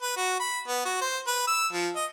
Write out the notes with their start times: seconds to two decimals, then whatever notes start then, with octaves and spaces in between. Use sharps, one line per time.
0.02 B4
0.17 F#4
0.40 B5
0.68 B3
0.85 F#4
1.02 C5
1.27 B4
1.48 E6
1.73 F3
1.96 D#5